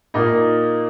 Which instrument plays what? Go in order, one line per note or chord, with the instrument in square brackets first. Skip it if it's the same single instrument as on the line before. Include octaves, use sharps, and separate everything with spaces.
[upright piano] A#2 A#3 D#4